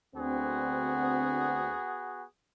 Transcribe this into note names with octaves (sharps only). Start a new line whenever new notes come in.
D2 B3 C4 F#4 G#4